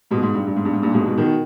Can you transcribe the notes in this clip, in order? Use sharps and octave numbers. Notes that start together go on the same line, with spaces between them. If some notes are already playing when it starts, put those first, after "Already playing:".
G#2 B2
G#2
G2
G2
G#2
G2
G#2
G2 A#2
G#2 B2
G#2 B2
B2 D#3